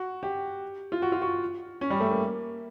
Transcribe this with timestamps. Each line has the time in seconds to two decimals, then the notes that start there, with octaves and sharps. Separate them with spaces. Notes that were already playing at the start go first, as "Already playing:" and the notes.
Already playing: F#4
0.23 G4
0.92 F4
1.02 F#4
1.12 F4
1.22 F#4
1.81 C#4
1.90 G3
2.00 A3
2.11 A#3